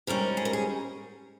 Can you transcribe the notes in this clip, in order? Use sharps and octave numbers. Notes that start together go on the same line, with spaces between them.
G#2 G3 C#4 A#4
G#4
A#4
G#4